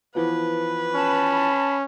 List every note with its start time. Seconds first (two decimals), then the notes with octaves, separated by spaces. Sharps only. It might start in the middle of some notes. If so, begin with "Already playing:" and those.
0.15 E3 F3 B3 B4
0.95 C#4 A5 B5